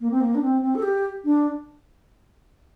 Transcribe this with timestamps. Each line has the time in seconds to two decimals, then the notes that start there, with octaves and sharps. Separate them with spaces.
0.01 A#3
0.11 C4
0.21 A#3
0.35 D4
0.42 C4
0.62 C4
0.75 A4
0.82 G4
1.24 D4